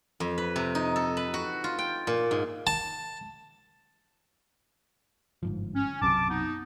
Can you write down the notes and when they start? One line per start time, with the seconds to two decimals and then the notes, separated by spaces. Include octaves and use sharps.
0.20 F2
0.38 B4
0.56 C3
0.75 D#4
0.96 A4
1.17 B4
1.34 F#4
1.64 F4
1.79 G5
2.07 A#2
2.31 G#2
2.67 A5
5.43 G1 G#2 F3
5.75 C#4
6.02 B1 F#2 C3 A5 D6
6.30 B3 D#4